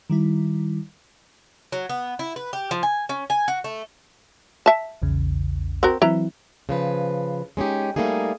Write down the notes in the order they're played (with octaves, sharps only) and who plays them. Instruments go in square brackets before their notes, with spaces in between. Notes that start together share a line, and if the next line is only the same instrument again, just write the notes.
[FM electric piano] D#3 G3 E4
[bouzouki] F#3
B3
E4
B4
G4
F3
G#5
C#4
G#5
F#4
A3
[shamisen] E5 A5
[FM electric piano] A#1 E2 C#3
[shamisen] C4 F#4 A#4
[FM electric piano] E3 F#3 C4 [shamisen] E4 B4 A#5
[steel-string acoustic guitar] C#3 F3 B4
G#3 C#4 D#4 G4
G3 A3 A#3 D#4 G#4